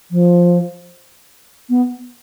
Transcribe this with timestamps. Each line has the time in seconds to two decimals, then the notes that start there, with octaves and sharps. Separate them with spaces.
0.11 F3
1.70 B3